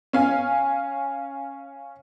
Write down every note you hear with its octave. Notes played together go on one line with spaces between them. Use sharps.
C#4 F5 G#5